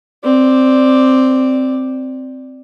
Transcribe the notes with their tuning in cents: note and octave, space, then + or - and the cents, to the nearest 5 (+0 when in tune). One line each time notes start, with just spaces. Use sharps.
C4 +0 D5 +0